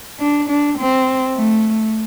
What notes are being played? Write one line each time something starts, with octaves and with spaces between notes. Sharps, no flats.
D4
D4
C4
A3